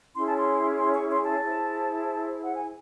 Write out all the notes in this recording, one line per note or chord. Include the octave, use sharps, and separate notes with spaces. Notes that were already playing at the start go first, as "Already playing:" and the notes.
C#4 E4 G#4 C#5 C6
A5
C6
C6
C#6
C6
A5
E4 G#4 C5
F#5
G#5